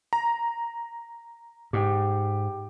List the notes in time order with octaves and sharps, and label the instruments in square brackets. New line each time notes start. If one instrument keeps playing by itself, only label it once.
[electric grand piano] A#5
[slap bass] G#2 [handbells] G4 G5